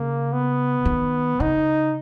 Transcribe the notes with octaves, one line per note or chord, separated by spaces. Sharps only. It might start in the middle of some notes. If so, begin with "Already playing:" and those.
Already playing: C#3 A#3
B3
D#3
C#3 D#4